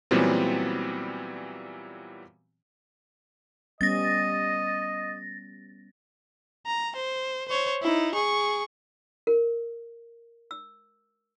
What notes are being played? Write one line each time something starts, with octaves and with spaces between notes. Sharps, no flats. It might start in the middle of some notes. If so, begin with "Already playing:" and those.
A#2 E3 F#3 G3 B3 C4
G3 B3 C#4 D#5 A6 A#6
A#5
C5
C5 C#5
D#4 E4
G#4 C#6
A#4
E6